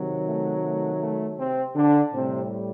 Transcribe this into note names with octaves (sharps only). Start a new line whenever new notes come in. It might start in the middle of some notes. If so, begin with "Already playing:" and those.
Already playing: C3 D#3 F#3
A3
A3
A3
C3 C4
D3 D4
A2 C3 G3 C4